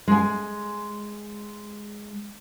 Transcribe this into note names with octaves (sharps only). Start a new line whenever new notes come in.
G#3 G#5